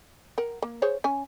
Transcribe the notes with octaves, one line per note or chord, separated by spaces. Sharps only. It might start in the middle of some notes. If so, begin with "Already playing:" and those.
A#4 F#5
A#3
G#4 C5 C#5
C#4 G#5